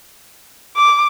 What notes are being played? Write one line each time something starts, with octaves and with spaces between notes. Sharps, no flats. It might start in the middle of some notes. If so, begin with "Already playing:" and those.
D6